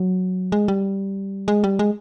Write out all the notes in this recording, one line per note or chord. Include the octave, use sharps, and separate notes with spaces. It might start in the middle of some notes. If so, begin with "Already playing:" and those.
Already playing: F#3
G#3
G3
G#3
G3
G#3